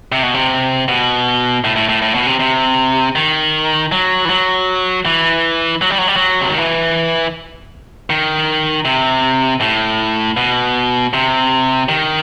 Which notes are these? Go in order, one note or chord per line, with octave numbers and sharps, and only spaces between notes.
C3
B2
C3
B2
A2
A2
A2
A2
B2
C3
C3
D#3
F#3
E3
F#3
E3
F#3
G3
F#3
G3
F#3
C3
D#3
E3
D#3
C3
A2
B2
C3
D#3